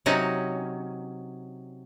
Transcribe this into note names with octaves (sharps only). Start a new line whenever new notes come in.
C3 F#3 C#4 D#4